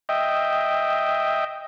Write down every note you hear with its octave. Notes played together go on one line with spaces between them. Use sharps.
D#5 E5 G5